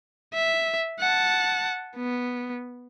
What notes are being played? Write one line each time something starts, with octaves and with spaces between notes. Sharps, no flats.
E5
F#5 A5
B3